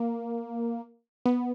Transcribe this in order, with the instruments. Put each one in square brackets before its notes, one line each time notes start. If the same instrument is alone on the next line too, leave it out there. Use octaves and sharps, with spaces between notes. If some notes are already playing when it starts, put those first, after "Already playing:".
Already playing: [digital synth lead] A#3
B3